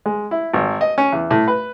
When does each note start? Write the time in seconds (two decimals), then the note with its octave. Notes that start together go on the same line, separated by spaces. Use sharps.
0.06 G#3
0.31 E4
0.53 G#1
0.81 D#5
0.98 C#4
1.13 E2
1.31 A2
1.48 B4